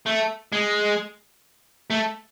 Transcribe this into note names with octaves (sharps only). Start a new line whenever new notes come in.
A3
G#3
A3